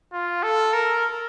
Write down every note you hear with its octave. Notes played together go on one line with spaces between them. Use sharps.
F4
A4
A#4